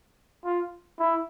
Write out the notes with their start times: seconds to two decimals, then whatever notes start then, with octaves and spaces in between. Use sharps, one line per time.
0.45 F4
0.99 E4